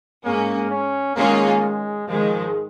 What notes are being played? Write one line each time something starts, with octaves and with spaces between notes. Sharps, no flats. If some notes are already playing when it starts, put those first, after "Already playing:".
G#2 G#3 A#3 C#4
C#4
D#3 G#3 A#3 C#4 F4
G#3
G#2 D#3 F3 G#3